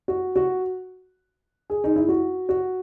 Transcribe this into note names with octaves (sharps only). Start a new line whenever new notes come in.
F#4
F#4
G#4
D#4
E4
F#4
F#4